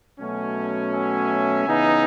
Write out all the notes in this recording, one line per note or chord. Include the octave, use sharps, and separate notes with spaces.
B2 F#3 A3 C#4
E5 G#5
C#3 E3 B3 D#4